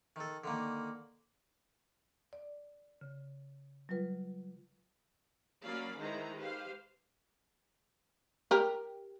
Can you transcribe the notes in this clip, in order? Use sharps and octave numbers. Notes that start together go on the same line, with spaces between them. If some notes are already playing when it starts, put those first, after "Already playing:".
D#3 A4
D3 D#3 A#3
D5
C#3
F#3 G3 F4 B4
F#3 A#3 C#4 D5 F5 B5
D#3 G#3 E4 B4 C5 A#5
G4 B4 C5 F5
G4 A#4